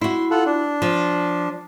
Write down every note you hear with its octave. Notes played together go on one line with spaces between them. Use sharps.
E4 F#4 C6
F4 A4 F#5
D4
F3